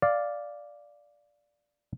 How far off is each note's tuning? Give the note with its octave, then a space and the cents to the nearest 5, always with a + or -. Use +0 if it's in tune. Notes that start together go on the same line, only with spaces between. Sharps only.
D5 +0 F5 +0